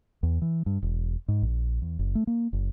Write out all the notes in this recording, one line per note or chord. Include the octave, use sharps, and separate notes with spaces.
E2
E3
G2
E1
G#2
A#1
E2
F#1
A3
A#3
F#1